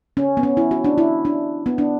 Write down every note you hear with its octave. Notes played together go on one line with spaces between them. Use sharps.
C#4
B3
C#4
E4
F#4
D4
E4
D4
B3
D4